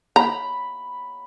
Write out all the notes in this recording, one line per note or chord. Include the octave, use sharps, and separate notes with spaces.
A#5 B5